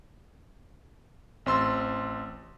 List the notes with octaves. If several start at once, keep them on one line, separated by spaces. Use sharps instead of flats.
A1 C4 C6 E6 A6